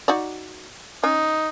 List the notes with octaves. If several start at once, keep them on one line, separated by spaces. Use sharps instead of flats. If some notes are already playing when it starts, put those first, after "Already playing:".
D#4 F#4 D5
C#4 D#4